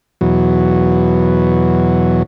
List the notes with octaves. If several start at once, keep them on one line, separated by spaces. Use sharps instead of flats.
E2 B2 F#3